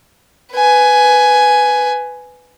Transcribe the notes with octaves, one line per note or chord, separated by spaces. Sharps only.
B4 G#5